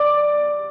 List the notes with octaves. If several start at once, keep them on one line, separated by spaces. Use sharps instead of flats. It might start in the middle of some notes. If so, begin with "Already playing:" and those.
Already playing: D5 D6